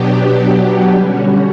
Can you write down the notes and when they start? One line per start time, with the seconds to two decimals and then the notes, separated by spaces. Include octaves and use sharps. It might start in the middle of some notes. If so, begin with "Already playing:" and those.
Already playing: B2 F#3 B3 D4 G4
0.91 D3 G3 C#4 F#4